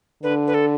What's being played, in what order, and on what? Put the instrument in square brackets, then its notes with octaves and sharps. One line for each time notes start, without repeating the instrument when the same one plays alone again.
[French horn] D3 [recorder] B4
[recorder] B4
A4